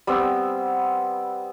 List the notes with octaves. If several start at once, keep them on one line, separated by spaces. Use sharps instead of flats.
G3 B3 C4 E6